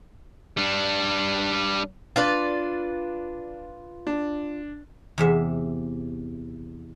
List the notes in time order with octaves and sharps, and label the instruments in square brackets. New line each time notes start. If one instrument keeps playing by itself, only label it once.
[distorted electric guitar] G3 D4
[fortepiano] D4 [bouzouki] F4 B4 D5
[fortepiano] D4
[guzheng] E2 C3 E5